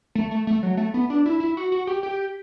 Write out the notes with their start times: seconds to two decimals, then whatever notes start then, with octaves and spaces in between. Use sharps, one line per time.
0.15 A3
0.31 A3
0.47 A3
0.63 F#3
0.77 A3
0.94 B3
1.10 D4
1.26 E4
1.40 E4
1.57 F#4
1.72 F#4
1.87 G4
2.03 G4